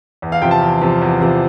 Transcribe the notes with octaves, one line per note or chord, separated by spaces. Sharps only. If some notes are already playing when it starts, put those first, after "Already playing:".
E2
F5
C3 F3 G5
A5
E2
C3 F3
E2
C3 F3